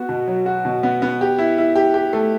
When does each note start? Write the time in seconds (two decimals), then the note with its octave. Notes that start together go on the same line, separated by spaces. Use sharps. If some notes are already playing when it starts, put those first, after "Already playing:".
Already playing: B3 F#4
0.09 B2
0.27 F#3
0.46 F#4
0.65 B2
0.83 B3
1.02 B3
1.21 G4
1.38 E4
1.58 E4
1.75 G4
1.94 G4
2.13 A3